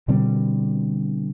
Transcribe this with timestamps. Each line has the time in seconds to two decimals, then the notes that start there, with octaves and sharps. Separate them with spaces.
0.08 B2 D3 G3 C4